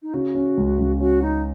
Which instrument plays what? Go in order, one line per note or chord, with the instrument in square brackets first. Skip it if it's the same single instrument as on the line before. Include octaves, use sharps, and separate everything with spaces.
[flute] D#4
[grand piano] C#3 [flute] F#4
[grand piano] C#4
C#2
C#2
[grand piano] C#4 [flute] F#4
[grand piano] C#4 [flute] D#4